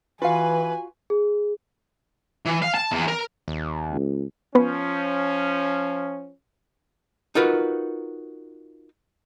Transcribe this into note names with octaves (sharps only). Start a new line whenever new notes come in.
E3 F4 F#4 B4 F5 G#5
G#4
E3
F5
A5
E2
A#4
D#2
C#2
F3 B3 C#4 B4
D#4 F4 F#4 A#4 B4